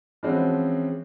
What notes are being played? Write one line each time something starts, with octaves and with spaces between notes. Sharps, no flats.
E3 F3 G#3 C4 C#4 F#4